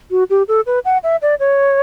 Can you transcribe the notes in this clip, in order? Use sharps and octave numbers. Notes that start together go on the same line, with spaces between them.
F#4
G4
A4
B4
F#5
E5
D5
C#5